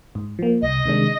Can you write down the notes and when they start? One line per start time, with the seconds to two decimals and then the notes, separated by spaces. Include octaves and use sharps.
0.15 G#2
0.39 F3 A#3
0.62 C2 D#5
0.85 C3 D#3 G#3 D4